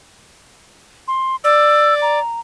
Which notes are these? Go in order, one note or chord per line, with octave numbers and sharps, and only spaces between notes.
C6
D5 E6
A#5